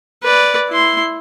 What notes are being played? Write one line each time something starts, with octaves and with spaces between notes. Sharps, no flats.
B4 D5
E4 C6